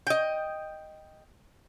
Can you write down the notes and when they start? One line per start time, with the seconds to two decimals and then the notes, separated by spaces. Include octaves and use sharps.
0.07 D#5 G5